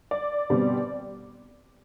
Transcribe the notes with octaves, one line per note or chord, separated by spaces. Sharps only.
D5
B2 G3 C4